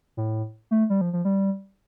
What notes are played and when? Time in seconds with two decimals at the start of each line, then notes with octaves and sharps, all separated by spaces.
0.17 A2
0.71 A3
0.90 G3
1.01 F3
1.13 F3
1.25 G3